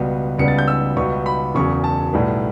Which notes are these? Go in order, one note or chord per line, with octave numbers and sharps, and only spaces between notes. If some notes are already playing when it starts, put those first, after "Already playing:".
Already playing: C#2 B2 G3 B3
C#2 C#3 G3 B3 C#7
A6
G6
E6
C#2 B2 G3 B3 C#6
B5
E1 E2 C#3 F#3 C#6
A5
B1 A2 G3 B3